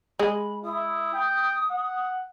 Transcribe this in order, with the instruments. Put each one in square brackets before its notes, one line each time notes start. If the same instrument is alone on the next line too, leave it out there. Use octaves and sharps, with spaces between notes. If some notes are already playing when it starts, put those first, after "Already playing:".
[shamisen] G#3 [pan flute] B5
[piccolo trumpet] E4 [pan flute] D#6
[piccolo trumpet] G5
F#5